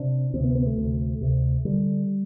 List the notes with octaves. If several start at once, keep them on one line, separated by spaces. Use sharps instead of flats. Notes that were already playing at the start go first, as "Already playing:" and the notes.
Already playing: C3 D4
D2 C3 C4
B3
B3
A3
D2 C3
D2 C3
D3 G3